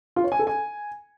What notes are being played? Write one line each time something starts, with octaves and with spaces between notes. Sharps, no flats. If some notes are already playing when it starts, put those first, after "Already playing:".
F4
C#5
G#5
A4
G#5